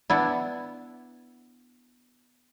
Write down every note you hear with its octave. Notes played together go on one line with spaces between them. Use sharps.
B3 D4 E4